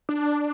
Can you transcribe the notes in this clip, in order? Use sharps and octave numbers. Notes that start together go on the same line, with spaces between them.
D4